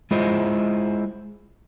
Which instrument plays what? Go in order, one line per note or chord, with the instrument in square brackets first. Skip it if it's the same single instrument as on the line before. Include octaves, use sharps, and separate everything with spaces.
[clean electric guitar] G#3 E4 F4 G#4 C5 D#5